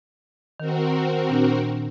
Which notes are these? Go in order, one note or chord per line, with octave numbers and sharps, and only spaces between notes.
D#3 C4 F#4 A#4
A#2 D4